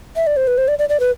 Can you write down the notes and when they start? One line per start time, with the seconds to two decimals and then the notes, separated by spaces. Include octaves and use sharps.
0.16 E5
0.27 D5
0.37 C5
0.47 B4
0.58 C5
0.68 D5
0.79 D5
0.89 D5
1.00 B4